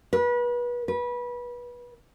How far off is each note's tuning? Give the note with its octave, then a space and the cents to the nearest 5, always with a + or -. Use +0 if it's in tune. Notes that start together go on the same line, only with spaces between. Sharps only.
B4 -30
B4 -25